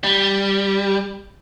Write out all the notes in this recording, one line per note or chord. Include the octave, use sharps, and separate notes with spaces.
G3